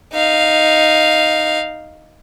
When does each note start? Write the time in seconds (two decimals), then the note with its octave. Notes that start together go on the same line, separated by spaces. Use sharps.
0.13 D#4 F5